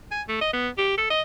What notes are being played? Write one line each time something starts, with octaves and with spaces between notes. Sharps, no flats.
G#5
A3
D#5
B3
G4
A4
D#5